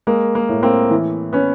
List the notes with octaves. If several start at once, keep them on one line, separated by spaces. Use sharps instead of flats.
G#3 A#3
A#3
A2
A#3 C4
E3
B3 C#4